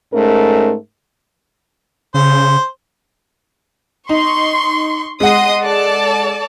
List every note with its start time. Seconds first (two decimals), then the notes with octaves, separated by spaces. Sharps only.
0.12 G#2 A3 C#4 A#4
2.14 C#3 C5
4.09 D#4 C6 C#6
5.20 G#3 D#5 F#5 C6 D#6
5.62 A4 D5 A5